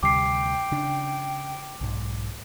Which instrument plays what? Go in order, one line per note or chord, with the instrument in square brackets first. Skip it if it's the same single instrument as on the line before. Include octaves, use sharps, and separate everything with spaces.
[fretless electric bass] D2 C3 G3 [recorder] G5 [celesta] D6 C7
[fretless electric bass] C#3 D4
B1 G#2